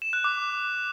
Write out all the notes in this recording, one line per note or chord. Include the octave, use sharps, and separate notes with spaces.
E7
F#6
D6